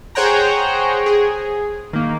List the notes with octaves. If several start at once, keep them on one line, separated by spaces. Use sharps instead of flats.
G#4 C5 C#5 F#5 G5 A#5
G#4
D#3 A#3